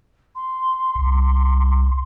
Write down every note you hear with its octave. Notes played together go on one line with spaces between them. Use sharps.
C6
C2